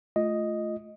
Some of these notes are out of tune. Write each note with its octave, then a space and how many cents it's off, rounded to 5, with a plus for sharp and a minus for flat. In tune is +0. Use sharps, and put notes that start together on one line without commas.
A3 -15 F4 +0 D#5 +0